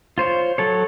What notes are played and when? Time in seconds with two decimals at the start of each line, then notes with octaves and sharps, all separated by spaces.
0.18 F4 C5 C#5
0.58 F#3 A4 C#5